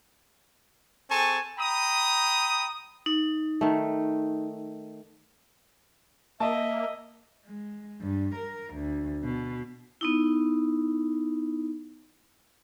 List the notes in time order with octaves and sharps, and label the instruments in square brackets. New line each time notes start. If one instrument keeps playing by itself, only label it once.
[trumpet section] C4 G#4 A4 G#5 A5 C#6
G5 A#5 B5 D#6
[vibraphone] D#4
[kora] D#3 A3
[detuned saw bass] A#3 [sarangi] D#5 [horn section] E5 [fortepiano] A5
[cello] G#3
G2
A#4
D2
B2
[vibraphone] B3 D#4 E4